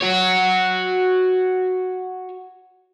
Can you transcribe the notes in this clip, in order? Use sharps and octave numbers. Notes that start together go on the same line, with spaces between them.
F#4 C#5